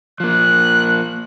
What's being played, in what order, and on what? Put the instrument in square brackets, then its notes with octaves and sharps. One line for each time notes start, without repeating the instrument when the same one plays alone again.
[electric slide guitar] F3 A#3 [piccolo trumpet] F#6